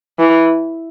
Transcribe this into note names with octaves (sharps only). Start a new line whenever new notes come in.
E3